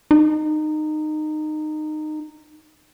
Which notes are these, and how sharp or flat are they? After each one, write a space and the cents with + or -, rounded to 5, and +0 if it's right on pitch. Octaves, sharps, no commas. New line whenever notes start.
D#4 -20